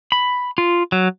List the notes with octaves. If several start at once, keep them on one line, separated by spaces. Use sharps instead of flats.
B5
F4
F#3